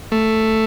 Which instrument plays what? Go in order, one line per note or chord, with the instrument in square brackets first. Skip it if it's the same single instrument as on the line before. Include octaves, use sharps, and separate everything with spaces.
[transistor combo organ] A3